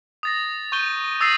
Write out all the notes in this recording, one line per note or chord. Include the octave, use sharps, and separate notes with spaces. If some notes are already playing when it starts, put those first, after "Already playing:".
D#6 A6 A#6
C#6 G6 D#7 G7
D#6 E6 A6 A#6 C7 D#7